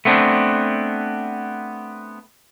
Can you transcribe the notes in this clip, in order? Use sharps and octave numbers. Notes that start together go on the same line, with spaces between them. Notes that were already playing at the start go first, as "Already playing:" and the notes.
A3 B3 C4 D4